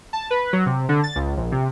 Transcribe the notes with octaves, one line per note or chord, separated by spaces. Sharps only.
A5
B4
F#3
C3
D3
A6
C#2
A#1
C3